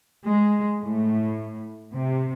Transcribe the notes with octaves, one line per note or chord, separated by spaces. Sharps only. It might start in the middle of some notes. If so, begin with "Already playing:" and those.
G#3
A2
C3